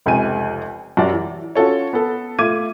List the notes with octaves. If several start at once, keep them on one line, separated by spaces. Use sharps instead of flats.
F1 C#2 C3 G5 G#5 D#7
F#2 F#4 G4 D5 A#5
E3
C#4 F4 F#4 A4 C#5
B3 A4
A3 F4 E5 D6 G#6 D#7